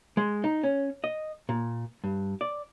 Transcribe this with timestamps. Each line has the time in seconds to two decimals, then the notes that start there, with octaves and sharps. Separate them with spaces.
0.17 G#3
0.44 D#4
0.63 C#4
1.04 D#5
1.49 A#2
2.04 G2
2.41 D5